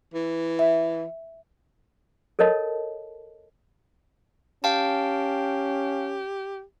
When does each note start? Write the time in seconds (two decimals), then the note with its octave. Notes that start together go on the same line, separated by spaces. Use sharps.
0.14 E3
0.59 E5
2.39 A4 A#4 C#5 D#5 A5
4.64 C#4 G4 F5 G5 A5